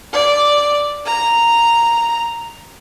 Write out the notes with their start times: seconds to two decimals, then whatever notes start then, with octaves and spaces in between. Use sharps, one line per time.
0.13 D5
1.06 A#5